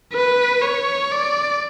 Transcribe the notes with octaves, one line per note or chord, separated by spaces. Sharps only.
B4
C#5
D5